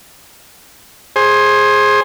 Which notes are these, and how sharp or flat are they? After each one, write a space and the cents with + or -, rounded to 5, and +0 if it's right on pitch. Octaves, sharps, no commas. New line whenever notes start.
G#4 +0 C5 +20